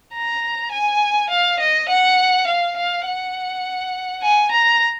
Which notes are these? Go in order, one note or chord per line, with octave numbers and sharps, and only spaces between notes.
A#5
G#5
F5
D#5
F#5
F5
F5
F#5
G#5
A#5